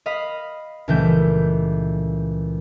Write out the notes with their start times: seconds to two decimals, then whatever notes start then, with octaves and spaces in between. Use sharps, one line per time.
0.06 D#5 F5 B5 F6
0.88 C#2 A#2 E3 G3 A3 G6